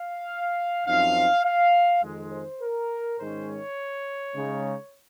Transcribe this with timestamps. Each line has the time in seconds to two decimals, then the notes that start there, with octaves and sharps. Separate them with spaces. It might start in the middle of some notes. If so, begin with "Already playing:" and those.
Already playing: F5
0.86 F#2 F3 C4 D#4 F5
1.44 F5
2.03 F2 D#3 G#3
2.31 C5
2.60 A#4
3.18 G#2 D#3 G#3 C#4 C5
3.47 C#5
4.34 C#3 G#3 D#4